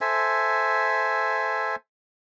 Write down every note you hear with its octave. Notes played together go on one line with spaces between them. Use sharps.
A4 C5 E5 G#5